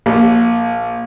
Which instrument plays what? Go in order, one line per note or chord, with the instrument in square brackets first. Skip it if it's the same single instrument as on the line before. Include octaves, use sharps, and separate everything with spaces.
[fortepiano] A#1